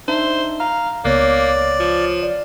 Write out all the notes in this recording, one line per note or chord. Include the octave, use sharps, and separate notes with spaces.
D4 D#4 C5 E5
F5 A#5
C#2 A#3 B3 C#5 D5 F#6
F3
D5